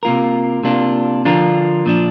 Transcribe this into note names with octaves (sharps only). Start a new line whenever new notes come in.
C3 A#3 F4 A#4
C3 A#3 D4 F4
D3 F3 D4 F4 A#4
A#2 F3 D4